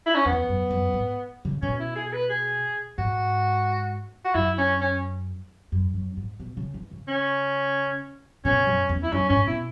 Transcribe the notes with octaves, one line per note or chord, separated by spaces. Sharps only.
E4
C#4
E2 B3
F#2
F#2
G#2
C#3
B2 C#4
E4
G#4
G#4
B4
G#4
G#2 F#4
F#4
F#2 E4
C#4
C#4
F#2
F#2
G#2
B2
C#3
E3
C#3
C#4
B2 C#4
F#2
E2
E4
F#2 C#4
G#2 C#4
B2 E4